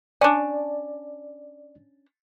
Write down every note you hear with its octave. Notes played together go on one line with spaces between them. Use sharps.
C#4 D4 D5